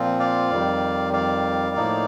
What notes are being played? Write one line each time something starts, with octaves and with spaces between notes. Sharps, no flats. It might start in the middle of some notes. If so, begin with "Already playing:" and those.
Already playing: A#2 F3 C4 F4
D5 F5
F2 D#3 G3
D5 F5
A2 F3 A#3 D#4